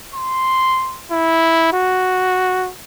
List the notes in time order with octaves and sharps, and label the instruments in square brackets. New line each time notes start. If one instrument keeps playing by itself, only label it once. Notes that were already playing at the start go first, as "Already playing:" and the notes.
[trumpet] C6
E4
F#4